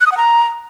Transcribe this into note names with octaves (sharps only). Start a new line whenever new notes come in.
F#6
D#6
F#5
A#5